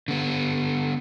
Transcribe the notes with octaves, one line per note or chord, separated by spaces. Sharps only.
D3 B3